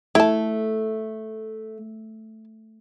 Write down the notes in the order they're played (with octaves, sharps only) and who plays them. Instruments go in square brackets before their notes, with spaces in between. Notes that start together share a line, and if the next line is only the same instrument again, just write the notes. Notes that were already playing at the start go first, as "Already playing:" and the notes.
[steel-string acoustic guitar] A3 [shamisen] E4 A5